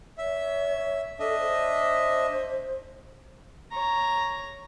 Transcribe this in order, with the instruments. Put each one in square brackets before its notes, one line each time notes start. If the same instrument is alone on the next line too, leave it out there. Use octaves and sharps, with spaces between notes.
[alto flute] C#5 [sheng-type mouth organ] E5
[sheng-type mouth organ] D4 D#5 E5 [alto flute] A4
[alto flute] C5
C5
[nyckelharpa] C#5 A#5